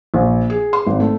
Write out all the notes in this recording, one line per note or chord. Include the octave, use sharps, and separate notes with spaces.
A#1
G#4
C6
G#1
A3